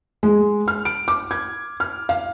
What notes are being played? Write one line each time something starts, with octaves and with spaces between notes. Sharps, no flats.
G#3
F6
D7
D6
G#6
F6
F5